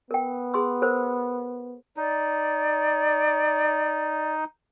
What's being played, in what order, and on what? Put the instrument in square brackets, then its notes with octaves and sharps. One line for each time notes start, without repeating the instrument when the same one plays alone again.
[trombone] B3 [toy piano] A#4 G5
[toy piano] G#4 C6 E6
A#4 C5
[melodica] D#4 [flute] D5